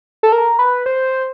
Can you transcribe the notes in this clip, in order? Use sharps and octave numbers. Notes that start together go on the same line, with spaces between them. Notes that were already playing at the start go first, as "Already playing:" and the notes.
A4
A#4
B4
C5